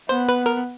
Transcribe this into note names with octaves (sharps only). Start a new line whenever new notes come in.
B3 C5
B4
A#4